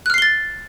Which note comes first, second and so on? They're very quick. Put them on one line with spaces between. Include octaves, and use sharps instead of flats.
F#6 F6 C7 G7 A6